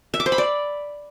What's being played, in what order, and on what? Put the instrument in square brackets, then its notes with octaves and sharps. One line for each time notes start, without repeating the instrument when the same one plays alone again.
[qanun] E5
D6
C5
B5
D5